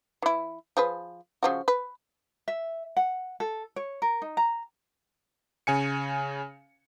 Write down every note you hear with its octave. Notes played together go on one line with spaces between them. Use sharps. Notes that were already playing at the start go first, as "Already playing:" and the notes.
E3 E4
F3 G#4 B4
C#3 F3 F#4
B4
E5
F#5
A4
C#5
A#4
D#4
A#5
C#3 G#5 C#7